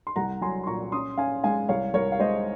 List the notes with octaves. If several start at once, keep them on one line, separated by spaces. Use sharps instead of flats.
C6
C2 F#5 A#5
F#3 G#5 C6
C6
A#2 A#5 C#6
C#4 C6 D#6
C#4 F5 G#5
G#3 F5 G#5
C2 C#5 F5
C2 A#4 C#5
F5
G#3 C5 D#5